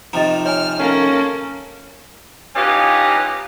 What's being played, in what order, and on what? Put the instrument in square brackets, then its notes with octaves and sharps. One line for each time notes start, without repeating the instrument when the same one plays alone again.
[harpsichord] C3 D#3 F3 [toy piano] D#5 A#5
[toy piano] C#5 G#5 [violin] F6
[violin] A#3 A4 [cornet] C#4
[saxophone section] A2 E3 C#4 D#4 F4 G4